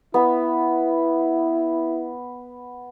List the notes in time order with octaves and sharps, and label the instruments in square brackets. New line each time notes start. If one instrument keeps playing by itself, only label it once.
[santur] B3 [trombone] E4